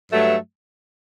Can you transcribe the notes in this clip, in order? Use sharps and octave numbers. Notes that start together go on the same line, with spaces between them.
G2 F#3 A3